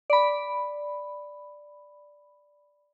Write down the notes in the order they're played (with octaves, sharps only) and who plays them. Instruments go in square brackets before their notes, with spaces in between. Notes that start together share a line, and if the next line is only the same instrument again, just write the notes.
[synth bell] D5 B5